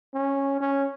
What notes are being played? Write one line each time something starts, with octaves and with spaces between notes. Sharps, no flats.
C#4
C#4